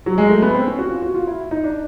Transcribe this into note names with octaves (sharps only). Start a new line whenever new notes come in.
F#3
G#3
A3
B3
C4
C#4
F#4
F4
F#4
F4
E4
D#4
D4